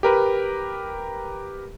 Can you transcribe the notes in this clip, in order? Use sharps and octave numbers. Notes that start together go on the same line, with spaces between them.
G4 A#4 B4